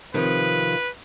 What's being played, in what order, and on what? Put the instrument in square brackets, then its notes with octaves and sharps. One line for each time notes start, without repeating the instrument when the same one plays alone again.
[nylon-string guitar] C3 D#3 F3 [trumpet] B4